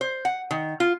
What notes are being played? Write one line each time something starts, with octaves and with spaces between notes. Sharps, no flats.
C5
F#5
D#3
F4